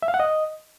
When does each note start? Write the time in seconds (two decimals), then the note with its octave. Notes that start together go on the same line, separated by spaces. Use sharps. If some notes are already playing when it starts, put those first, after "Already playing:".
0.02 E5
0.08 F5
0.14 F#5
0.20 D#5